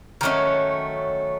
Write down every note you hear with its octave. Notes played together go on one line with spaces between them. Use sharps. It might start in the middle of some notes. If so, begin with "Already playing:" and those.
D#3 F#3 A3 C#4